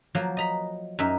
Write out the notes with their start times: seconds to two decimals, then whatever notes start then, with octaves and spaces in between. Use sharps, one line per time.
0.15 F3 F#3 A#3
0.37 D#5 A#5 B5
0.99 F#2 D#4 D#5 E5